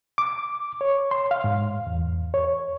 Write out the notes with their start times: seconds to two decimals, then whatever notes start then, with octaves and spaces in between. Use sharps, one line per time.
0.18 D6
0.81 C#5
1.11 C6
1.31 F5
1.44 G#2
1.87 E2
2.34 C#5